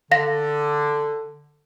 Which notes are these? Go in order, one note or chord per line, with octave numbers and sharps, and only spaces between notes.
D3 F5 A#6